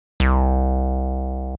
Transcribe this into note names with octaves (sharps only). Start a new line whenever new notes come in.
C2